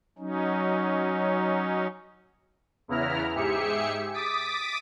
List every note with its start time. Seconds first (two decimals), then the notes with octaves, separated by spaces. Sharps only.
0.18 F#3 C#4 D#4
2.88 E2 C#3 B3 E4 A#5 F6
3.34 G#2 G4 G#4 E5 C#7
4.13 D6 D#6 A6 B6 D7